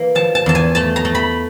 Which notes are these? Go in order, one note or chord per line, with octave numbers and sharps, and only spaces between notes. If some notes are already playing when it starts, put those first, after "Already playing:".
Already playing: E3 A#3
F3 A5
A5
E2 A5
G#5
A3 A5
A#5
A3
B5